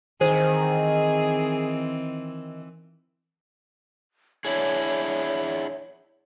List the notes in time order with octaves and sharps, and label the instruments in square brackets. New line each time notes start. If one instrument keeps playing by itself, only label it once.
[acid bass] D#3 [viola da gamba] E3 C4 [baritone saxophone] G#4 [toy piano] C5
[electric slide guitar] D4 E4 G#4 [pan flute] C#5